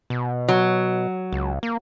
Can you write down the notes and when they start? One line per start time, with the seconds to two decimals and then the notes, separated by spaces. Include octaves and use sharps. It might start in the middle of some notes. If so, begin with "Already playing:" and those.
0.10 B2
0.49 F#3
1.33 C#2
1.63 A#3